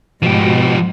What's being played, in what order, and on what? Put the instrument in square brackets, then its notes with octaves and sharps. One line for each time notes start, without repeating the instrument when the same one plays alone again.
[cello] G#2 [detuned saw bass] B2 [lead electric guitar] F3 G4